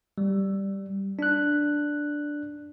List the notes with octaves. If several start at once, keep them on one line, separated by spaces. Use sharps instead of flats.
G3
D4 F#6